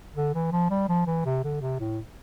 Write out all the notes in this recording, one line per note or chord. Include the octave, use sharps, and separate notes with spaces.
D3
E3
F3
G3
F3
E3
C3
D3
C3
A2